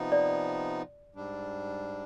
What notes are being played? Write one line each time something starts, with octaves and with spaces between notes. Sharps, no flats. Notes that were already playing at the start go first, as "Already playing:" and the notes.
Already playing: C3 F3 B3 D#4
D5
G#2 G3 D4